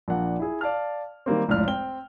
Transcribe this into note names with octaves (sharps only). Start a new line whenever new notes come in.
A#1 A#3 D4 F#5
E4 G#4
D5 F5 A5 F6
D#3 G3 A#3 C4
F1 C#2 A2 D5 F6
C4 G5 G7